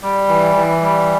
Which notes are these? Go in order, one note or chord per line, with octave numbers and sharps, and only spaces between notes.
G3
E3
E3
G3